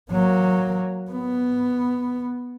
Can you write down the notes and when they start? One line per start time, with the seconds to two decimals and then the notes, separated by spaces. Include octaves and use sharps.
0.11 F#3 A#3
1.11 B3